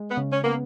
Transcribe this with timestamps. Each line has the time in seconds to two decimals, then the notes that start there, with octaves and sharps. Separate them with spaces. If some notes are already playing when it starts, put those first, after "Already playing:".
Already playing: G#3
0.10 B3
0.17 C#3
0.32 C#4
0.44 A#3 B3